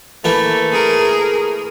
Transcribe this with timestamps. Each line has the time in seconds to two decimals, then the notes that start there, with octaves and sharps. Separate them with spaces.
0.24 E3 A3 A#3 E4
0.72 G#4 A#4